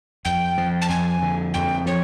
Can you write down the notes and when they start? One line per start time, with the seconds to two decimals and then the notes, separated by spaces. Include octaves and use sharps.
0.25 F2 G5
0.58 F3
0.82 A5
0.89 F2 G#5
1.22 D3
1.54 F2 G5
1.86 F3 C#5